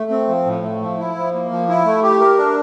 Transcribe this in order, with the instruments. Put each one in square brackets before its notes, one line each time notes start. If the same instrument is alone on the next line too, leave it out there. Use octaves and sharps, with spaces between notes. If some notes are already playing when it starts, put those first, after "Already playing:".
Already playing: [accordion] A3
C4
F3
A2
A3
F3
E4
F3
A#3
F3
E4
A3
G4
A#4
D4